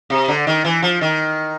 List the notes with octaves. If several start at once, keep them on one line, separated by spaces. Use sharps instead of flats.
C3
D3
D#3
E3
F3
D#3